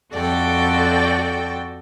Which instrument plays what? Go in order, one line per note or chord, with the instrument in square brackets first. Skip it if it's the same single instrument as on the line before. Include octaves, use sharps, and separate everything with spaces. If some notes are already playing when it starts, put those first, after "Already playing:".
[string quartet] F2 F#4 A4 D5 G5